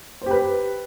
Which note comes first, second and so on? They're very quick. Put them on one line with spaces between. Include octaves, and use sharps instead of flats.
C5 G4 B4